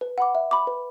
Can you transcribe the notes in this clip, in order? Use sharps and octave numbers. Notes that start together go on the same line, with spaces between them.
B4
F#5 B5 D6
E5
B5 D6
B4